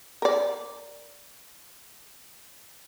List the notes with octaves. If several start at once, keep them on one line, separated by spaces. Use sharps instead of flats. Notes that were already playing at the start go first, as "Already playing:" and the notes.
A#4 D5